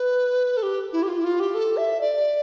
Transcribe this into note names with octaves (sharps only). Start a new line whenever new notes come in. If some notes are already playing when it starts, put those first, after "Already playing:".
Already playing: B4
A4
G4
E4
G4
F4
E4
F4
G4
A4
E5
D5